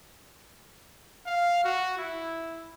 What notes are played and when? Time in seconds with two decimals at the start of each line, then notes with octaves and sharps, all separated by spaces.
1.27 F5
1.65 F#4
1.98 E4